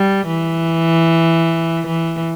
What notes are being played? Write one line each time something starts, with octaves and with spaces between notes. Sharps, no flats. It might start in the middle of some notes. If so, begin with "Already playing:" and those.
Already playing: G3
E3
E3